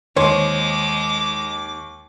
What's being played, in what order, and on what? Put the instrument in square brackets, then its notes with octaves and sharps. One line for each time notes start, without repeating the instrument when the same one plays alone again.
[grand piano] D#2 [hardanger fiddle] G#3 [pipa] C5 C#5 [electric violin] D6